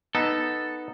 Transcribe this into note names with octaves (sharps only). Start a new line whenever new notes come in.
B3 D#4 A4